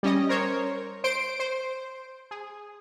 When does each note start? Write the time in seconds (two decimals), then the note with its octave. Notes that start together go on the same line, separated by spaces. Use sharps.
0.03 G3 C#4 D#5
0.29 A#4 C5 C#5
1.04 C5 C6 D7
1.40 C5
2.31 G#4